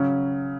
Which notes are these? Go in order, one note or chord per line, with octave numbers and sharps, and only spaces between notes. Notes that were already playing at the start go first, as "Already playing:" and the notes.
Already playing: C#3 F#3 C#4